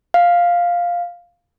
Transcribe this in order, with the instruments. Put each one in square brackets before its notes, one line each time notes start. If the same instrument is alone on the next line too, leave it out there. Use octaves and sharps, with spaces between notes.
[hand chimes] F5